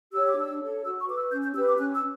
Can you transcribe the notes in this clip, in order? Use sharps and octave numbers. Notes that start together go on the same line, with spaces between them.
G4 C#5 E6
D6
D4 E6
A4 C#5
F#4 E6
C#6
B4 D6
E6
C#4 G6
G6
G4 B4 E6
D6
C#4 F#6
E6